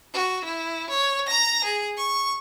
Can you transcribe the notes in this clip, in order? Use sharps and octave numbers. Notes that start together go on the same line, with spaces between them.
F#4
E4
C#5
A#5 A#6
G#4
C#6